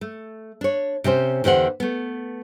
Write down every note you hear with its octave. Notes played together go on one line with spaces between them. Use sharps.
A3
D4 C#5
C3 C#4 G4 C5
E2 D3 G4 C5 F#5
A3 B3